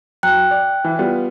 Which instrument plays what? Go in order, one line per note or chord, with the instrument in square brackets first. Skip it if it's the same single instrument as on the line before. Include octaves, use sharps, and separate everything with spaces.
[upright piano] F#3 [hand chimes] G5 F#6
[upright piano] D5
E3
G3 B3 F4